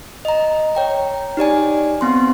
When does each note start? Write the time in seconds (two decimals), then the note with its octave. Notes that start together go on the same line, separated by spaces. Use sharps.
0.25 D#5 A#5
0.75 C#5 G5 A#5
1.37 D#4 G4 D5 G#5
2.01 B3 C4 C6